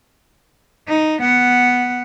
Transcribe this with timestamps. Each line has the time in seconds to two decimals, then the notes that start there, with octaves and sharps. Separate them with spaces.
0.88 D#4
1.21 B3 F#5